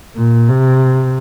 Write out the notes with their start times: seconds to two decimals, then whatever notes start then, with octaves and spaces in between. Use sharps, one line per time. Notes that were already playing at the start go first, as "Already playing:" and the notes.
0.16 A#2
0.49 C3